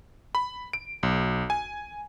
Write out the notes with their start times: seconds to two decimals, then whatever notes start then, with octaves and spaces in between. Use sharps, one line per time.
0.35 B5
0.73 D7
1.03 B1
1.50 G#5